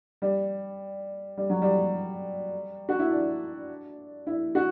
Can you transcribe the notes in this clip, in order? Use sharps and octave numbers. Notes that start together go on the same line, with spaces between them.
G3
G3
F#3
G3
F#4
E4
D4
E4
F#4